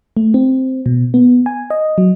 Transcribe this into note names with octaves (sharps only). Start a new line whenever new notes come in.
A3
C4
B2
B3
G#5
D#5
F#3